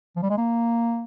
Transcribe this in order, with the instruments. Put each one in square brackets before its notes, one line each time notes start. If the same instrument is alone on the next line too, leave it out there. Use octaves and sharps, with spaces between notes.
[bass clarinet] F3
G3
G#3
A#3